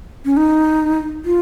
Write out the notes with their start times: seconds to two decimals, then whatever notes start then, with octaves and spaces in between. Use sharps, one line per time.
0.25 C#4
0.37 D#4
1.25 F4